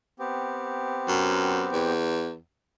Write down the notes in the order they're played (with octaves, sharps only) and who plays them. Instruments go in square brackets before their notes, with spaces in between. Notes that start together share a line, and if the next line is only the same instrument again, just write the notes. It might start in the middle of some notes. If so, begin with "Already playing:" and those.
[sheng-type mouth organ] B3 C4 G4
[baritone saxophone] F#2
E2